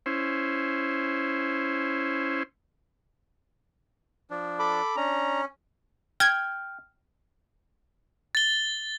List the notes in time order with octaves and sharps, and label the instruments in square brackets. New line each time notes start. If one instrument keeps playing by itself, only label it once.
[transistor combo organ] C#4 E4 C5
[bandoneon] F3 D4
[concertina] A4 B5 D6
[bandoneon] C#4 [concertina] D4 A#5
[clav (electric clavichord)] G5 [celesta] F6 [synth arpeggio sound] G#6
[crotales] A6 G7